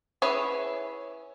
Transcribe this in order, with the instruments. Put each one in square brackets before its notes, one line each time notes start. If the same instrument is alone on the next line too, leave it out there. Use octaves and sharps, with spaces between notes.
[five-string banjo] C#4 E4 G#4 B4 C#5